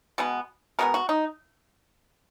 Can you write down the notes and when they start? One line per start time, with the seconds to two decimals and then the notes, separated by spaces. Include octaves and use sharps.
0.18 B2 G#3 B3
0.79 B2 G#3 B3 A#4
0.94 F#4
1.09 D#4